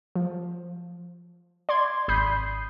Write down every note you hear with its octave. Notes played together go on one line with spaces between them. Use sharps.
F3
D5 C6 G#6
G#1 B5 D#6 G6 C7